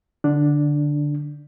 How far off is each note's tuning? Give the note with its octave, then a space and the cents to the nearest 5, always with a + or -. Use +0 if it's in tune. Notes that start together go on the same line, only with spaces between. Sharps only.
D3 +0 D4 +0